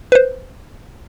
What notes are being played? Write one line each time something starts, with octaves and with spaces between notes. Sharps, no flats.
B4 C5